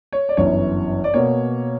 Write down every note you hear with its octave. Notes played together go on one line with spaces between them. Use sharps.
C#5
D5
G1 F#2 E3 C#5
D5
B2 A#3 C#5